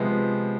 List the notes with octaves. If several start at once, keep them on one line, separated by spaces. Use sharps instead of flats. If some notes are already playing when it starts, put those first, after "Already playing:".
Already playing: C3 F3 G#3 B3